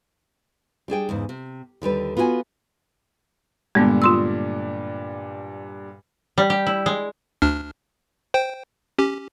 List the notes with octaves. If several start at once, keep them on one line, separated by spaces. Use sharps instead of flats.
G3 D4 G#4 G5
E2 G#2 C#3
C3
D#2 D3 G3 B4
B3 F4 F#4 A#4 G#5
G2 A#2 D3 G#3 B3
F4 C6 E6
G3
G4
E4
G#3
D2 D4 F6
C5 G5
C#4 G4